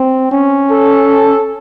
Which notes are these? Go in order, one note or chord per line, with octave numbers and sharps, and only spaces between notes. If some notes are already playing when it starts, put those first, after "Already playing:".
Already playing: C4
C#4
A4